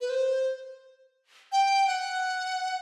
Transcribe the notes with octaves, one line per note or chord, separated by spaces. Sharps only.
B4
C5
G5
F#5